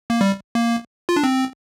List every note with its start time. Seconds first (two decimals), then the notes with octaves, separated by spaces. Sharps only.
0.10 A#3
0.21 G3
0.55 A#3
1.09 F4
1.16 D4
1.24 C4